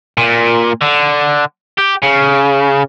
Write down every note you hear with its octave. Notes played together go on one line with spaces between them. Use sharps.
A#2
D3
G4
C#3